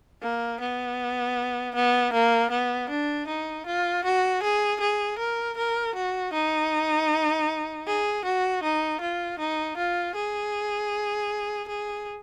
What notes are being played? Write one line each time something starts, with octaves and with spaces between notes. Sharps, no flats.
A#3
B3
B3
A#3
B3
D4
D#4
F4
F#4
G#4
G#4
A#4
A#4
F#4
D#4
G#4
F#4
D#4
F4
D#4
F4
G#4
G#4